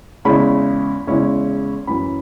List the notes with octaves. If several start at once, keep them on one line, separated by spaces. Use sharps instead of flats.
E2 C#3 G#3 C#4 E4 B5
E2 C#3 G#3 C#4 E4
F#2 E3 C#4 B5